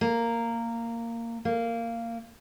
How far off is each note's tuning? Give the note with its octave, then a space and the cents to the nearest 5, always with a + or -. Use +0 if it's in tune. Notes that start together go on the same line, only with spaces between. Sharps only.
A#3 -10
A#3 -15